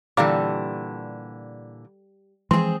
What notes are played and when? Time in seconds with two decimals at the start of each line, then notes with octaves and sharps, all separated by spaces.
0.17 A#2 D3 E3 G3 A4 F5 A#5 D6
2.51 E3 F3 G#3 C4 G#4 C6